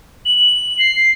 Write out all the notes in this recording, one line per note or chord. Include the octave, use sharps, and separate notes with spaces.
F#7
C7